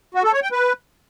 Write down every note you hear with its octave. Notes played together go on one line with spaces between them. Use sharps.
F#4
A4
C#5
G5
B4